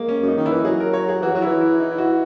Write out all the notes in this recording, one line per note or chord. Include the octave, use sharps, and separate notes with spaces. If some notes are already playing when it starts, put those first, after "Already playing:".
Already playing: G#3 A#3
C#4
F#2 D#4
D#3
E4
E3
F#3 G#4
A#4
C#5
G#4
E3 F#4
F#3
E4
E3
E4
D#4
E4
F#4